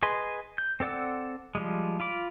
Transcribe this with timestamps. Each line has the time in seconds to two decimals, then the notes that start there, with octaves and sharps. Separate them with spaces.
0.03 G#4 B4 D#5 C6
0.58 G6
0.80 C4 A4 D5 F#5 E6
1.55 F3 G3 G#3
2.00 F4 B5 D6